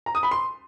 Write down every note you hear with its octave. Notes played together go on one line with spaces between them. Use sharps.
A#5
D#6
B5
C6